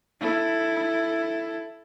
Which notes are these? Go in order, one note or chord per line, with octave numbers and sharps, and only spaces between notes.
E4 A4